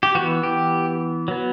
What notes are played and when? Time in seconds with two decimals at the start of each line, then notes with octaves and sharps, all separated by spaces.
0.03 G4
0.15 E3 B3 F#4
0.43 G4
1.28 F#3 B3